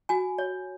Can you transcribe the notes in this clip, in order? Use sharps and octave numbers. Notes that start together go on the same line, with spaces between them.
F#4 G#5
C#5